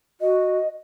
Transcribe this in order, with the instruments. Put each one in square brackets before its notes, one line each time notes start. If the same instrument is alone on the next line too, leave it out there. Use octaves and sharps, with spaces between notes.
[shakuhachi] F#4 [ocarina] D#5